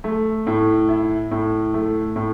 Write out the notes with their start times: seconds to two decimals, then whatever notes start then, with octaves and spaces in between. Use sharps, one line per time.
0.04 A3
0.47 A2
0.89 E4
1.31 A2
1.74 A3
2.16 A2